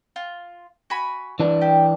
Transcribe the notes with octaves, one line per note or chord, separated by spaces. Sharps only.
F4
F#4 G#5 B5
E3 D4
G4